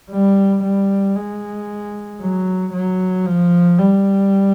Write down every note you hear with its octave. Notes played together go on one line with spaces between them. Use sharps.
G3
G3
G#3
F#3
F#3
F3
G3